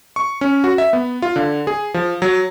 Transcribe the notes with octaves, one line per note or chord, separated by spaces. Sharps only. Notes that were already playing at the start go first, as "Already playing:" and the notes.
C#6
C#4
F#4
E5
B3
F4
D3
G#4
F3
F#3